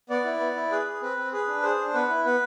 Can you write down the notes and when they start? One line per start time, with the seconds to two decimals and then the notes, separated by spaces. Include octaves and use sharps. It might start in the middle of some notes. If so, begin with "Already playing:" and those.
0.10 B3 D5
0.25 E4
0.40 B3
0.56 E4
0.71 G#4 B4
0.86 G#4
1.02 C4 B4
1.17 C4
1.32 G#4 B4
1.48 D4
1.63 G#4 C5
1.79 D4
1.94 B3 B4
2.09 E4
2.25 B3 B4